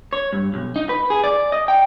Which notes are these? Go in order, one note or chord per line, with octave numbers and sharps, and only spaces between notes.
C#5
G2
B1
D#4
B4
G#4
D5
D#5
G5